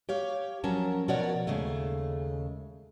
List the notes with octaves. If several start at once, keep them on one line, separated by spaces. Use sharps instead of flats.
G4 C#5 F5
F3 F#3 C#4 A#4 A5
B2 F3 A#4 C#5 D5 F#5
D#2 C#3 G#3 A3